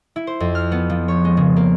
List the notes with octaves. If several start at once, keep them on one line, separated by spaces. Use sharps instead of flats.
E4
C5
F2
F6
B3
F3
C#5
G#3
C#3
A#3